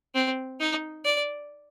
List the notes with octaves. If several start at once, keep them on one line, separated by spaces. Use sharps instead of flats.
C4
D#4
D5